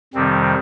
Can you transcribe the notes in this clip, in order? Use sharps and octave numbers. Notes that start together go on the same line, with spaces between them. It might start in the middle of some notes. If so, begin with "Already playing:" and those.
F2 C3 D#3 G3 C4